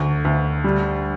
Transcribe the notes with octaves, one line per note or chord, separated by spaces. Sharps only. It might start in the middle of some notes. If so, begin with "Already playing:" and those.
Already playing: D2
D2
G3